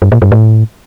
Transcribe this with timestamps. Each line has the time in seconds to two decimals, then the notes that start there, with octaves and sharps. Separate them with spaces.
0.02 G2
0.12 A#2
0.22 G2
0.32 A2